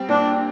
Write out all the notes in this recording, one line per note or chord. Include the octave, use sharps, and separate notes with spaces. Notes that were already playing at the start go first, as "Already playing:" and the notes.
Already playing: G3 C4
A#2 D4